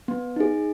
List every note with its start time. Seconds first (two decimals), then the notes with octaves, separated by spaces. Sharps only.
0.08 B3
0.36 D#4 G#4